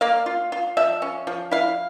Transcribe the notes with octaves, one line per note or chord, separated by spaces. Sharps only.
A#3 F5
F4
F4
F3 E5
C#4
F3
E4 F5